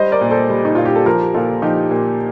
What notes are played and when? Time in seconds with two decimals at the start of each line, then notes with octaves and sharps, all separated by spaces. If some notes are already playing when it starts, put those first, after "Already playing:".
Already playing: G3 C5 D#5
0.12 A#4 D5
0.21 A#2
0.30 A4 C5
0.50 G3
0.65 D#4
0.75 A#2 F4
0.85 G4
0.96 A4
1.06 F3 G4 A#4
1.34 A#2 F4 A4
1.62 F3 D#4 G4
1.91 A#2